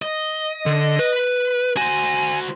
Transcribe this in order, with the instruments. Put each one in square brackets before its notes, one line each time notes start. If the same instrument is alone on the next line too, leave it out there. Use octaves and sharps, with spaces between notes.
[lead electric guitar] D#5
[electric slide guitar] D3
B4
[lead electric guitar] F#4 C5 [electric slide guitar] G#5